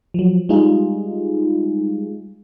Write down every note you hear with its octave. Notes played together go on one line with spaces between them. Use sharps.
F3 F#3
G3 G#3 D#4 F4 G#4